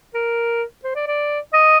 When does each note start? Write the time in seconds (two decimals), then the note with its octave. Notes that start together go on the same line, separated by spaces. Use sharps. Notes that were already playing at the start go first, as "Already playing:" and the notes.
0.14 A#4
0.84 C5
0.95 D5
1.07 D5
1.53 D#5